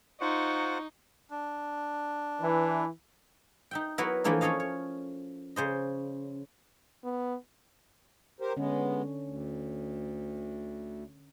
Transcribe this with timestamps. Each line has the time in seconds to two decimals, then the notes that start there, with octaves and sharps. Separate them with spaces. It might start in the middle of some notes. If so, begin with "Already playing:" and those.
0.21 D#4 F4 C5 F#5 C#6
1.31 D4
2.41 E3
3.71 D#4 E5 G5
3.98 F#3 B3 E4 F#4 A#4 B4
4.24 E3 F3 A3 A#3 D4 E4
4.41 C#4 A4 C#5 D#5 F5
4.60 C#5
5.56 C#3 C5 D#5
7.04 B3
8.40 G4 A#4 C5
8.57 D3 G#3 B3 C#4
9.25 D2